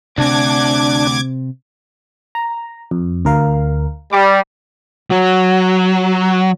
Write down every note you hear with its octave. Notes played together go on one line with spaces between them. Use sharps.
D2 C3 C4 D4 D6 G#6
A#5
F2
D2 A#4 F5
G3 D6
F#3